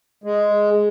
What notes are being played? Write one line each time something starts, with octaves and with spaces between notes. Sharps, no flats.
G#3